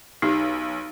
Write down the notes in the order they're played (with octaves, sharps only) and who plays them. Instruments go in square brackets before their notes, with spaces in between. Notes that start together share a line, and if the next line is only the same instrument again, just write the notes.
[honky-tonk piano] B1 [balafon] D#4 G4